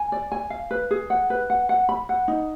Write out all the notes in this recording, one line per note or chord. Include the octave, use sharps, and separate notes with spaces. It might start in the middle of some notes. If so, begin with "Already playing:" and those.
Already playing: G#5
D5
G#5
F5
B4
G#4
F#5
B4
F#5
F#5
B5
F#5
D#4